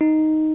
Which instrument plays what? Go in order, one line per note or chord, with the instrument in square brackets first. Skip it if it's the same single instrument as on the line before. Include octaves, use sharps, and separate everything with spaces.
[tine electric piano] D#4